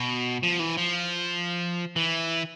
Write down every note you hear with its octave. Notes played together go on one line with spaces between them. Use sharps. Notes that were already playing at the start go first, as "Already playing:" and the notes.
Already playing: B2
F3
E3
F3
E3